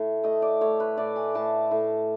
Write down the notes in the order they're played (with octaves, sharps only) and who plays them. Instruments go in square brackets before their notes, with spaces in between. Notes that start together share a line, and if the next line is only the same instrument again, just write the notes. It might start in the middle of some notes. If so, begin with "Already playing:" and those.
Already playing: [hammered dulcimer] A2
A3 D#5
D5
A3 C#5
B4
A2 D5
G#5
A2 A5
A2